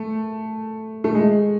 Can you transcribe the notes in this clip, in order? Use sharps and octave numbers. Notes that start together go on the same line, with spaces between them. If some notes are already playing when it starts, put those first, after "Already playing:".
Already playing: A3
A3
G#3